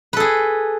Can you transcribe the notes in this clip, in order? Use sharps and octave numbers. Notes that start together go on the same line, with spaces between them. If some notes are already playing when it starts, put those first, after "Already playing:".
G#4 A4 B4